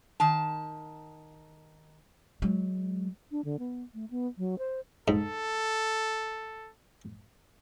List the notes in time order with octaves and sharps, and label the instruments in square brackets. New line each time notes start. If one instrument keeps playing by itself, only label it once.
[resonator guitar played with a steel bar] D#3 A5
[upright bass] F#3 G#3
[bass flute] D4
D3
B3
A3
B3
F#3
C5
[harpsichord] G#2 [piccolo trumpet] A4